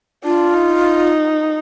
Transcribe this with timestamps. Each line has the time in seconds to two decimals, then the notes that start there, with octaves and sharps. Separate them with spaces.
0.24 D4 F4
0.55 D#4